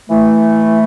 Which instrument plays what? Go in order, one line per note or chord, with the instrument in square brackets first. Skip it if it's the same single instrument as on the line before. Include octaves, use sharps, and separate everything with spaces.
[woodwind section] E3 A3